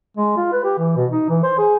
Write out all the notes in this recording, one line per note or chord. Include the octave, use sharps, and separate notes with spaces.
G#3
F4
B4
G4
E3
B2
D#4
E3
C5
G#4